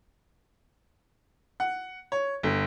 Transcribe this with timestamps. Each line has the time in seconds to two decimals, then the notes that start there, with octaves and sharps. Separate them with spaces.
1.60 F#5
2.12 C#5
2.43 G1